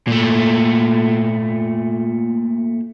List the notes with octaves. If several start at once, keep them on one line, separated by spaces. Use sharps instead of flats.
A#2 A3